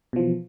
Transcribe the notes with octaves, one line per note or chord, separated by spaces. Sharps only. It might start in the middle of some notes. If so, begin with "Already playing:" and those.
B2 E3 F3